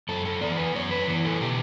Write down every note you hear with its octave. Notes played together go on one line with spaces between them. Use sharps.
F#2 A4
A4
E3 B3 D5
B4
F#2 C#5
B4
E3 B3
A4
B2 G4